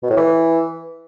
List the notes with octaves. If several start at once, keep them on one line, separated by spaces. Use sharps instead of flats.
B2
A2
E3